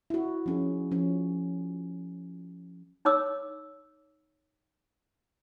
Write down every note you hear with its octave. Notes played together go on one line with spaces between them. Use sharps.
E4 F#4
F3 C#4 G#4
F3 C#4
D#4 C#5 D6 E6